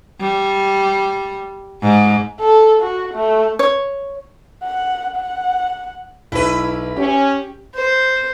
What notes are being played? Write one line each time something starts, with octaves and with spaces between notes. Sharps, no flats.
G3
G#2
A4
F#4
A3
C#5
F#5
F#5
B1 E4 B4
C#4 G4
C5